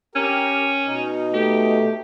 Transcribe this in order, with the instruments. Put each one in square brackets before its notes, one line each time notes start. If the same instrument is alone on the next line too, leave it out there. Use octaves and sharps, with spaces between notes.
[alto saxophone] C#4 [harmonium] G4 A#4
[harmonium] B2 D#4
[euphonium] A3 [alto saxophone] G4